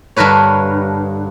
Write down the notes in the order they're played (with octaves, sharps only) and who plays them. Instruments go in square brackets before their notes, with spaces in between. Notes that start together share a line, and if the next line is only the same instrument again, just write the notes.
[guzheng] G2 D3 A#4 B4 C#5